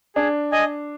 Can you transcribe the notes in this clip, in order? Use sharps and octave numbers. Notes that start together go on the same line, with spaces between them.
D4 G#4
D#5 G#5